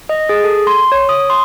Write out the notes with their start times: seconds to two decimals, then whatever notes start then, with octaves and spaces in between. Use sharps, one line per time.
0.09 D#5
0.29 G#4
0.44 A4
0.67 C6
0.92 C#5
1.09 D#6
1.30 C6